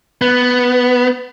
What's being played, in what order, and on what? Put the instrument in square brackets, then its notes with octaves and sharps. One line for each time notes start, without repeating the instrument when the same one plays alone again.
[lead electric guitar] B3